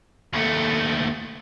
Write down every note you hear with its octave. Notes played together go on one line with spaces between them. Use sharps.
D#2 A3